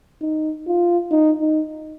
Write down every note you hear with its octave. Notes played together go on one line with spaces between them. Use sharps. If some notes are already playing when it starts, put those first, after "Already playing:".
D#4
F4
D#4
D#4